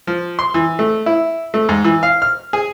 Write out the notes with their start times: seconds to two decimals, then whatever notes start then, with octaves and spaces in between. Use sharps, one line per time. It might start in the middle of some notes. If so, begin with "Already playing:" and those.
0.07 F3
0.39 C6
0.54 E3
0.79 A3
1.06 E4
1.54 A3
1.69 G#2
1.84 E3
2.03 F5
2.22 F6
2.53 G#4